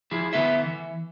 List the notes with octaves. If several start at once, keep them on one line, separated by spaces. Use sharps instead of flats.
F3 E4 G#4
D3 B3 E4 A4 E5
E3